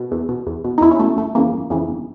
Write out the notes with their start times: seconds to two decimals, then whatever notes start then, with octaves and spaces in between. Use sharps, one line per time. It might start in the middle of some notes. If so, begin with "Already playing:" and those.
Already playing: B2
0.11 E2
0.29 B2
0.47 E2
0.64 B2
0.78 D#4
0.81 E2 E4
0.91 C#4
0.99 B2 A3
1.17 G1 A3
1.35 F2 C#3 E3 A#3
1.52 G1
1.70 F2 C#3 E3
1.88 G1